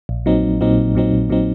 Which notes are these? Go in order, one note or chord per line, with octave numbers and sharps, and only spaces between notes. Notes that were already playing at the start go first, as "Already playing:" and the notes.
A#1
A#2 F#3 C4 D#4
A#1
A#2 F#3 C4 D#4
A#1
A#2 F#3 C4 D#4
A#1
A#2 F#3 C4 D#4